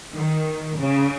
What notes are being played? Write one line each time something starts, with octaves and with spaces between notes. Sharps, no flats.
D#3
C#3